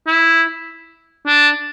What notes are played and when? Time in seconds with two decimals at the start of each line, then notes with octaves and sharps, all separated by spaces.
0.07 E4
1.26 D4